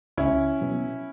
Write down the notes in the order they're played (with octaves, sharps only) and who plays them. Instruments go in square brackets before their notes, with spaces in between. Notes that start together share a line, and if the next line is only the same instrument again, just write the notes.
[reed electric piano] C#2 [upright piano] C#4 E4
[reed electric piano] B2 F#3 B3